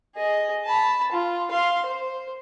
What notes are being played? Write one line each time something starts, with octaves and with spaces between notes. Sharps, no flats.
G#4 D#5
A5 B5
F4
F5 C6
C5